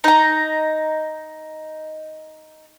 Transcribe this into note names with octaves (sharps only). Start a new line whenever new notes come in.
D#4 A#5